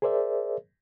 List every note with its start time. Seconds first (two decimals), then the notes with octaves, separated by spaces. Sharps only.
0.02 G#4 A#4 C5 D5 E5